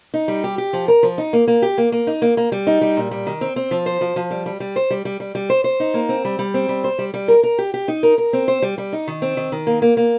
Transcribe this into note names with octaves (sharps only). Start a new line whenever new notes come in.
D#4
G3
G4
G4
F3
A#4
F3
D#4
A#3
A#3
G4
A#3
A#3
D#4
A#3
A#3
G3
D#4
G3
A#2
G3
D#3
C4
C4
F3
C5
F3
F3
G3
G3
G3
C5
G3
G3
G3
G3
C5
C5
D#4
A#3
C4
G3
G3
C4
G3
C5
G3
G3
A#4
A#4
G4
G4
D#4
A#4
A#4
C4
C5
G3
G3
D#4
D#3
C4
D#3
D#3
A#3
A#3
A#3